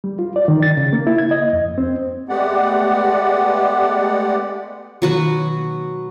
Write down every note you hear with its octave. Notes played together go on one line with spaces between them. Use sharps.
G3
F4
D5
D#3
A6
C#3
A#3
E4
G#6
D#5
F2
C4
G#3 A3 B3 G4 D5 F#5
B2 D#3 F#3 A#3 F#4 B4